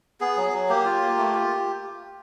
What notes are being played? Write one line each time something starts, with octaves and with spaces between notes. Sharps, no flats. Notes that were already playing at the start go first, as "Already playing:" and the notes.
B3 G#4
F#3
F#3
A#3 G4
F4
A#3
A3
F4